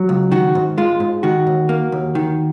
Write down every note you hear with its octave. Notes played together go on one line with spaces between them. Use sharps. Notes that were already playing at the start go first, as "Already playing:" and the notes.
Already playing: F#3
C#2
D#3 F#4
G#2
G#3 F4
G#2
D#3 F#4
D#2
A#3
D#2
D#3